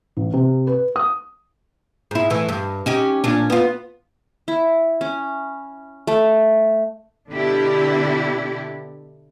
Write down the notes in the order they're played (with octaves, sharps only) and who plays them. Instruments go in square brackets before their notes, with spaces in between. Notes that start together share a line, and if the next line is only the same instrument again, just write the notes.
[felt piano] A1
C3
B4
D#6
[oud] G#2 E4
A2 E3
G2
C#4 D#4 G4
A#2 C#4 D4
B3 F4
[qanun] E4
C#4
A3
[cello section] B2 D3 D4 E4 G4